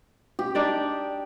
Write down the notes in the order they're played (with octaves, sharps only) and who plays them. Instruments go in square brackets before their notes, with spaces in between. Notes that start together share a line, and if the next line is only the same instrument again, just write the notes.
[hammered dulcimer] G4
[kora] D4 D#4 D5